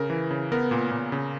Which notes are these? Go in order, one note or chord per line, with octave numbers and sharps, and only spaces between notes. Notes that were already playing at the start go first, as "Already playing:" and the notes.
Already playing: C#3 A#4
E3
C#3
B3 A#4
A#2
A#2
C#3